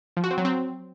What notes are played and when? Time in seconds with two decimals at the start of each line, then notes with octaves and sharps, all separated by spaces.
0.17 F3
0.24 F#4
0.31 C4
0.38 F#3
0.45 C4